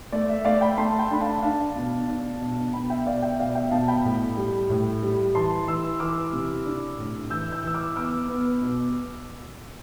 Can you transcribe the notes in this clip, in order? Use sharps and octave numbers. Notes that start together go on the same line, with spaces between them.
A3 D5
E5
A3 D5 F5
G5 B5
A3 A5 C6
G5 B5
D4 B5
F5 A5
D4 F5 A5
B2
D4
B2
B2 G5 B5
E5 G5
B2 D5 F5
E5 G5
B2 D5 F5
E5 G5
B2 F5 A5
G5 B5
A2
G3
A2
G3
E3 A5 C6
E3 C6 E6
E3 D6 F6
C3
D4
A2
E3 E6 G6
E6 G6
E3 E6
D6 F6
B3 D6 F6
B3
B2